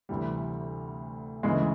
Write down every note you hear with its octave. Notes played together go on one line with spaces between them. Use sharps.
D2 C3 E3 G3
D2 C#3 E3 G#3